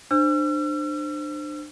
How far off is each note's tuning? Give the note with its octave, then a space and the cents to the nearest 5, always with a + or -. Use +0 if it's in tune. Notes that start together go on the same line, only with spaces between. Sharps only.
D4 +30 C5 +0 E6 +45